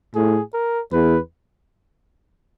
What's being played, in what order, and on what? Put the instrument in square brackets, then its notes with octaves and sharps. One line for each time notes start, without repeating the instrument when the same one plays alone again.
[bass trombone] A2 [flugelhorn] G#4
[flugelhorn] A#4
[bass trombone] E2 [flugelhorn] B4